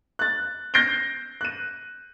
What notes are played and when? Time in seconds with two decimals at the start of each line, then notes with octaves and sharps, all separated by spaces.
0.19 F#6 A6
0.74 G6 A#6 C7 D7 G7
1.41 F#6 D#7